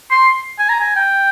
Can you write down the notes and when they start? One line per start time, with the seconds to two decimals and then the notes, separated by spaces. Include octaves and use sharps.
0.11 C6
0.59 G#5
0.69 A#5
0.80 G#5
0.96 G5